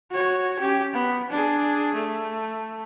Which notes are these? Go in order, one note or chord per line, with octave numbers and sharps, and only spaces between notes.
F#4 C#5
C#4 G4
B3
D4 G#4
A3